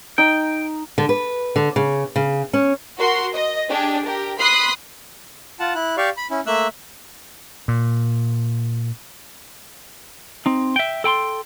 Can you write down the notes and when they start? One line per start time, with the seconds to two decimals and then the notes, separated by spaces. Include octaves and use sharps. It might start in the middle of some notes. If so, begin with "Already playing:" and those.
0.18 D#4 G5
0.98 D3
1.09 B4
1.56 D3
1.76 C#3
2.16 C#3
2.53 C#4
2.98 F#4 A#4 C6
3.34 D#5
3.69 D4 G4 G#4
4.04 G4 A#4
4.39 B5 C6 D#6 F#6 C7
5.60 F4 F#5 A5
5.75 E4 F#6
5.97 G4 D5 F5 C#6
6.17 B5
6.31 C#4 E4
6.46 A3 A#3 E5 E6 F#6
7.68 A#2
10.46 C4 D#4
10.76 E5 G5
11.04 A4 G5 B5 C6